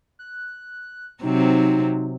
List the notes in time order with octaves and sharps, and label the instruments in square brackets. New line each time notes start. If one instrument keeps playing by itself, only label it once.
[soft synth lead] F#6
[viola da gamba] C3 F#3 C4 [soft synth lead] D#4